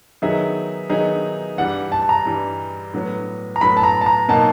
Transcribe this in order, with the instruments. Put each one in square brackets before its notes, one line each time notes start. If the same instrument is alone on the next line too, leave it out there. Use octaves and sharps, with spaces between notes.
[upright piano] D#3 F#3 B3 D#4 G#4 [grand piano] E5
[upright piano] D#3 F#3 B3 D#4 G#4
[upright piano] G2 E3 G3 [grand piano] F#5
[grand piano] A5
A5
A#5
[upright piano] G2 E3 G3
A2 F#3 B3
[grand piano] A#5
[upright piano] A2 F#3 B3 [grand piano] B5
[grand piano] A5
A#5
A5
A#5
[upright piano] B2 F#3 A#3 D#4 [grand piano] A5